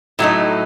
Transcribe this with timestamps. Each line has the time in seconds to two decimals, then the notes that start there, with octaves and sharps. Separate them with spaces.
0.19 A2 F#3 A3 D#4